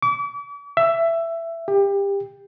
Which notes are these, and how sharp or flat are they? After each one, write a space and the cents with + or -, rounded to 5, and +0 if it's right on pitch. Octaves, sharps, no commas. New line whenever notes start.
D6 -35
E5 +15
G4 +25